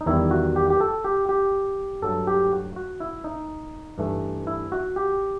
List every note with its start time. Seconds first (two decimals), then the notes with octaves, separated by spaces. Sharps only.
0.01 D#4
0.06 E2 D#3 G3 E4
0.31 F#4
0.56 G4
0.70 G4
0.81 A4
1.04 G4
1.29 G4
2.02 G2 F#3 A3 A4
2.27 G4
2.52 F#4
2.76 F#4
3.00 E4
3.24 D#4
3.98 G2 E3 A3
4.47 E4
4.72 F#4
4.96 G4